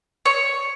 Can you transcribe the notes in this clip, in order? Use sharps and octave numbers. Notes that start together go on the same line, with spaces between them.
C#5